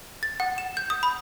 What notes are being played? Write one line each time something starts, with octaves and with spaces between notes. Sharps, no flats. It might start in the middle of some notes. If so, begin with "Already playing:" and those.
A6
F#5
E7
G6
D#6
B5